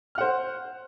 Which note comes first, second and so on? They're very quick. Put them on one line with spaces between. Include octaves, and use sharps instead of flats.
F6 F#5 C5